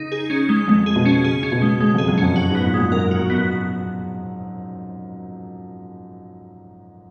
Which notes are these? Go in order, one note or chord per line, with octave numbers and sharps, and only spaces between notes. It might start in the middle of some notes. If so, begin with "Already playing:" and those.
Already playing: C#3 D#4
G#4
C#4
G#3
F2 G#3
G#4
B2
C#4
C#3 G#4
C#4
B2
G#3
C#3 G#3
F2 G#4
F#2
F2 C#4
F#2 F#4
G#2 B3
A#2
F#2 G#3
F#2 A#4
F#4
F#2
B3